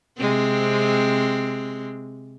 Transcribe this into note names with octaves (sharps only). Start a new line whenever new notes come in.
C3 G#3 C4